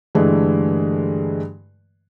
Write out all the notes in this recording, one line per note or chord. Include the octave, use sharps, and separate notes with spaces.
G2 D3 E3 G#3 A3